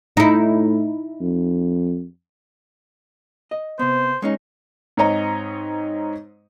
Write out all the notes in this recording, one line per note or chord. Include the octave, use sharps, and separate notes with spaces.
A2 D#4 E4
F2
D#5
C3 B3 C5
G#3 C#4 D#4
G#2 C4 C#5 D#5 A#5